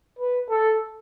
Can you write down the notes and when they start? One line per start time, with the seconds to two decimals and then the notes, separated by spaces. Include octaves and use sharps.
0.19 B4
0.49 A4